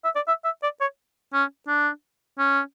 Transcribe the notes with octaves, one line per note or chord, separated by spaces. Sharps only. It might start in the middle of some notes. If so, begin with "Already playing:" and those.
E5
D5
E5
E5
D5
C#5
C#4
D4
C#4